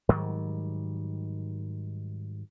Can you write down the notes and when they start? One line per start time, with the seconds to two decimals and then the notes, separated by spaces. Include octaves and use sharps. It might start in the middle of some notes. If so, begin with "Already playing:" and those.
0.09 G#2 D#3 F#3 G3